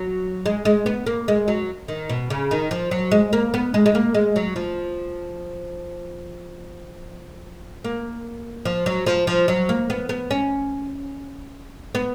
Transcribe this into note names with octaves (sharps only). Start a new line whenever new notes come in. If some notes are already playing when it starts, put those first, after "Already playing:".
Already playing: F#3
G#3
G#3
B3
A#3
G#3
F#3
D#3
B2
C#3
D#3
F3
F#3
G#3
A#3
B3
G#3
G#3
A#3
G#3
F#3
F3
A#3
F3
F#3
F3
F3
F#3
A#3
B3
B3
C#4
B3